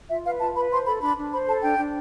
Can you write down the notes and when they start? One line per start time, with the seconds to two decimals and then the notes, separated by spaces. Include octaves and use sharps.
0.10 F4 E5
0.25 B4 F5
0.40 F4 A5
0.55 B4 B5
0.71 C5 C6
0.86 A4 B5
1.02 D4 B5
1.18 D4
1.32 C5 B5
1.48 A4 A5
1.63 D4 G5
1.79 D4